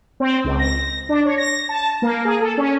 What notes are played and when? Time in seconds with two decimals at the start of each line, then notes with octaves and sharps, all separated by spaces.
0.20 C4
0.44 C#2
0.59 A#6
1.09 D4
1.26 C#5
1.38 A#6
1.69 A5
2.02 A#3
2.25 G#4
2.40 A4
2.57 C#4